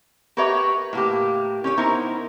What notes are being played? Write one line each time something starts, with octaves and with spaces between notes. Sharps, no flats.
F#4 G4 A#4 B4 C#5 E5
A2 A#3 G4
C#4 G4 C#5
B3 D#4 E4 A#4 C5